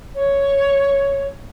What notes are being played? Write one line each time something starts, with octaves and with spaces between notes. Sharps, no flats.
C#5